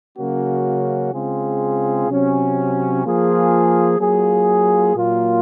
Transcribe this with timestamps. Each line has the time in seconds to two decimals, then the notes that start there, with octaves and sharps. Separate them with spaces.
0.18 C#3 F#3 A#3 C#4 F#4
1.13 C#3 G#3 C4 F4 G#4
2.08 C3 F#3 C#4
3.05 F3 A#3 F4 G#4
4.00 F#3 A#3 F4 G#4
4.95 A#2 F#3 A#3 F4